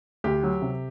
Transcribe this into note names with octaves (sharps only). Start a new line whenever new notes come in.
D2 G4
F#3
C3